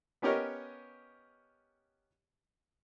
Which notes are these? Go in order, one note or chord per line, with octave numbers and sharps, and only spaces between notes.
B3 C#4 G4 A#4 C#5 D#5